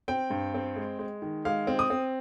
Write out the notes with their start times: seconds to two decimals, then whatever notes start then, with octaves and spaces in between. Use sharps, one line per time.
0.08 C4 G5
0.30 G2
0.54 C4
0.76 G#3
0.99 G#3
1.22 D#3
1.45 G#3 F5
1.67 C4
1.79 D#6
1.90 C4